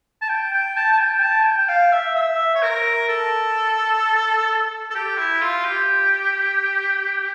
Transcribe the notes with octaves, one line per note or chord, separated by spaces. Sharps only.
A5
G5
G5
A5
A5
G5
A5
G5
G5
F5
E5
E5
C#5
A#4
A4
A4
G4
E4
F4
G4